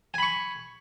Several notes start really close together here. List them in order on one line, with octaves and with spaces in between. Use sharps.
G#5 B5 C#6